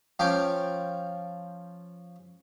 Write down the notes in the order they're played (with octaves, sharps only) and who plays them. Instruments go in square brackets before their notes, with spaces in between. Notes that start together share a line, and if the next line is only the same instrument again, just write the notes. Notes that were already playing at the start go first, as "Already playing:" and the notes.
[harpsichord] F3 C#4 G5 D6